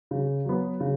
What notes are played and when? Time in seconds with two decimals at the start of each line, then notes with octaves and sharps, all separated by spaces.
0.11 C#3
0.45 F#3 B3
0.80 C#3